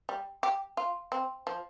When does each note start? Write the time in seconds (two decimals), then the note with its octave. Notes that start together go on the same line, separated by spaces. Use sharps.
0.09 G3
0.43 G4
0.77 F4
1.12 C4
1.47 F3